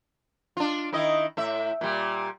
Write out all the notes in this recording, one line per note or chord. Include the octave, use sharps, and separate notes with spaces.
D4 F4
D#3 E4 D#5
A2 E5
A#2 G3